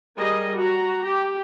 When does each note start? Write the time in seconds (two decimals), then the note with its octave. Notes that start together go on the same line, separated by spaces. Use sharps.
0.16 G3 G#4 A#4 D#5
0.56 F#4 A#5
1.06 G4